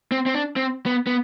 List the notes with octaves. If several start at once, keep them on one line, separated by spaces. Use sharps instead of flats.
C4
C4
D4
C4
B3
B3